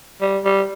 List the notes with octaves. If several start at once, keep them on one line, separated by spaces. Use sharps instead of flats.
G3
G3